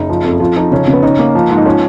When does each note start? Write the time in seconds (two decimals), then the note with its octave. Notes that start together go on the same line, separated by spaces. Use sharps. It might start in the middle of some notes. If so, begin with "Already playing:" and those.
Already playing: F#1 D#4
0.10 F3
0.24 F2
0.40 F3 F4
0.56 F3 D#4
0.72 C#3 C#4
0.88 C#3
0.93 B3
1.02 C#4 D#4
1.19 A#3
1.35 F3
1.50 G#2
1.57 D#4
1.65 F3 C#4